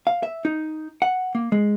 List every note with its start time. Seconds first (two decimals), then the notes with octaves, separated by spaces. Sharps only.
0.07 F5
0.23 E5
0.45 D#4
1.02 F#5
1.35 A#3
1.52 G#3